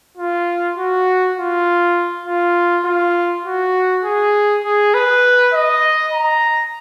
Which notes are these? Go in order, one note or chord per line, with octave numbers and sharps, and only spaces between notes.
F4
F#4
F4
F4
F4
F#4
G#4
G#4
B4
D#5
A#5